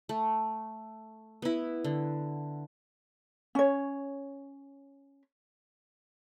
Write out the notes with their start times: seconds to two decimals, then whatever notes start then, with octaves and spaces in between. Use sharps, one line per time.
0.09 A3
1.42 B3 E4
1.84 D3
3.55 C#4 C#5